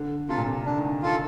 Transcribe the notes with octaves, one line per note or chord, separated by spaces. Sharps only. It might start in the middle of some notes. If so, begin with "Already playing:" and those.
Already playing: D3
C3 F4 A4
A#2
C3
D3 D4
D#3
D3
D#3 F4 A4